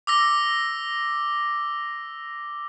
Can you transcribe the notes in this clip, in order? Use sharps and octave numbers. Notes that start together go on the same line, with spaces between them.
D6 E6 A#6